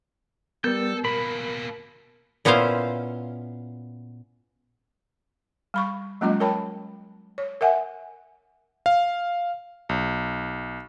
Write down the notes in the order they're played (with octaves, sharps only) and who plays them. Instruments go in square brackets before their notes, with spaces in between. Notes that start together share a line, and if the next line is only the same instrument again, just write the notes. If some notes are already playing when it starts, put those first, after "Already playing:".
[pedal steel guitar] G3 G6 [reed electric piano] B3 A#4 [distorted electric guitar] A4
[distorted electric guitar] B2 A#3 [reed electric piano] A#4 [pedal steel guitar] B5
[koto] A#2 B3 C#4 E4 C5 F5
[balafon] G3 B5 C#6
F#3 G#3 A#3 C#4 F4 D#5
A#4 C#5 G5 A5 B5
C#5
A#4 E5 F#5 G#5
[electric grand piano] F5
B1